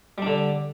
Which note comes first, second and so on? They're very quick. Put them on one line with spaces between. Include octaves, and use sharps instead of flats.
G3 D4 D3